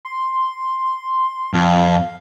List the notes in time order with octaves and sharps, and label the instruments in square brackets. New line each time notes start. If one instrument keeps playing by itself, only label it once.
[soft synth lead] C6
[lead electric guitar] F2 [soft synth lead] F5